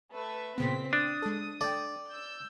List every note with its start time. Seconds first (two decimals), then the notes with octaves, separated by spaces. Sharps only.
0.11 A3 B4 E5
0.58 A#2 C#3 B3 C4 B6
0.93 D4 D#6
1.22 G#3 A4
1.61 A4 D5 G5
2.09 E6 G6